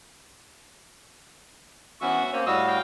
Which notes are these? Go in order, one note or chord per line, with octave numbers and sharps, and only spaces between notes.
E3 B3 C#4 F#4 E5 C#6
A#3 C4 C#4
A2 G3 F#4 D#5 F5 E6
F5 G5